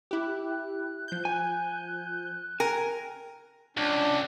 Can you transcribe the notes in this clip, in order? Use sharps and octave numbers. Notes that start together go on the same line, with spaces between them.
E4 G4 F#6
F3 G6
G#5
A#4 G5 G#5
C#2 D4